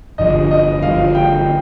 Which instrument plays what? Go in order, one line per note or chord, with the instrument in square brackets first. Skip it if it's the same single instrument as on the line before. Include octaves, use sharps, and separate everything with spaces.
[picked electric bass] G1 G2 D3 F3 [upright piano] D#5
[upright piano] D#5
[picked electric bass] G1 G2 D3 F3 [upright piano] F5
[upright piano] G5